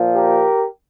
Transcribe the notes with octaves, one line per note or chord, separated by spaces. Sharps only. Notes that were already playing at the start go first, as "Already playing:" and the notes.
Already playing: A#2 F3
G4 A#4